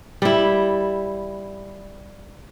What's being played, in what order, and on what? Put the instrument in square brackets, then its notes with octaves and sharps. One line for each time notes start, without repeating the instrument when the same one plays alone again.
[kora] G3 E4